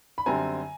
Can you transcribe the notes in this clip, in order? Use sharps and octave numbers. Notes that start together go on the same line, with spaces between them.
B5
F#2 D3 G3 C4 G#5 A#5